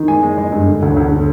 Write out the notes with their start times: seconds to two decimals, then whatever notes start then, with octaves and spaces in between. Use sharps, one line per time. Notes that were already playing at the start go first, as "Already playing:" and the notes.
Already playing: D#3
0.08 G#3 G#5
0.23 G#3
0.38 G#3
0.52 G2
0.67 D3
0.82 D2
0.96 D2
1.11 D3